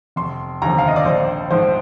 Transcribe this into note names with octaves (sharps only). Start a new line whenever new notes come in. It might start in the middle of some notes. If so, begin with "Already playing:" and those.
F1 C6
D#2 D3 F3 A#5
F5
D#5
D5
A#1 C5
G#2 F3 C5